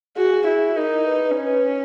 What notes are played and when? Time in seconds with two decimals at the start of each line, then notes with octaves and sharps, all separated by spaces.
0.17 F#4 G#4
0.47 E4
0.76 D#4 A#4
1.07 B4
1.37 C#4 B4